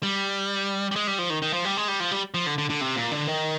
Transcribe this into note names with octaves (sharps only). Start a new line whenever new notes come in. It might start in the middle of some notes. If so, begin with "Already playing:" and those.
G3
G3
G#3
G3
F3
D#3
D#3
F3
G3
G#3
G3
F3
G3
F3
D3
D3
D3
C3
A#2
D3
D#3